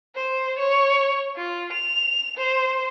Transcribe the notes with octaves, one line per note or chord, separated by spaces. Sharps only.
C5
C#5
F4
F7
C5